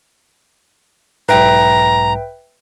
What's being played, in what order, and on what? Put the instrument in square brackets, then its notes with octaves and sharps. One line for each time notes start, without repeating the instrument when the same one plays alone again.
[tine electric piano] B1 G#2 [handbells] B4 E5 G5 [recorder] A#5